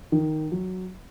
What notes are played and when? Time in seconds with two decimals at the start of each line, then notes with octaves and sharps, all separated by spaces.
0.12 D#3
0.52 F#3